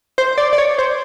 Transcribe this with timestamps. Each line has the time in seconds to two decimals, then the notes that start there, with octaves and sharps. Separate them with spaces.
0.18 C5
0.38 D5
0.53 D5
0.58 C#5
0.79 C5